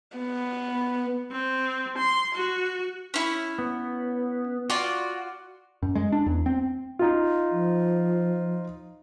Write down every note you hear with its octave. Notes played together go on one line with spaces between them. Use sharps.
B3
C4
C6
F#4
C#4 E4
B3
F4 F#4 D5
F#2
G#3
D4
E2
C4
D#4 F4
F3